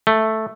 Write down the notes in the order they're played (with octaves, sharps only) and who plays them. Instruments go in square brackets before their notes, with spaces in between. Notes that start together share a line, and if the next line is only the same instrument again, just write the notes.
[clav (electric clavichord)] A3